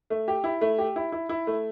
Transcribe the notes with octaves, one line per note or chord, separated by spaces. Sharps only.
A3
G4
E4
A3
G4
E4
E4
E4
A3